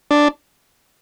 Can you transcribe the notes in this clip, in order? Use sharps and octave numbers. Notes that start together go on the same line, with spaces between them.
D4